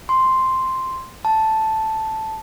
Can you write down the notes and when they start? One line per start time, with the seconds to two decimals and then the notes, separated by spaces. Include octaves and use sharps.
0.09 C6
1.25 A5